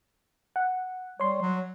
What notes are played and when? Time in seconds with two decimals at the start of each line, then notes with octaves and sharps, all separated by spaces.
0.56 F#5
1.20 G3 C#5 C6
1.41 F#3